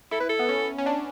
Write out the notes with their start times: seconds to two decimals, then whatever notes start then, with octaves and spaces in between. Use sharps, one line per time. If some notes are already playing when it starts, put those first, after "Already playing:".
0.11 E4 A4
0.21 B4
0.29 A4
0.39 B3
0.49 C#4
0.78 C#4
0.86 D4